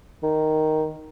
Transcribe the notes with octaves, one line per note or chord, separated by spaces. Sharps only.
D#3